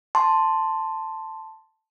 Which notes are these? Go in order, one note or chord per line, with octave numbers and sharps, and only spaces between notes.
A5 C6